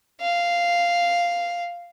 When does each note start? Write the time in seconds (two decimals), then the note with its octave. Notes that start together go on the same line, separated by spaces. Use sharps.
0.21 F5